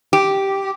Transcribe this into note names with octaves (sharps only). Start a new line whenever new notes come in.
G4